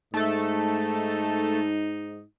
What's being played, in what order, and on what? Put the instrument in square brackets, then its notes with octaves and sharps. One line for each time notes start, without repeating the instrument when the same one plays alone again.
[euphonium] G#2 [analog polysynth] A3 A4 [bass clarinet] D#4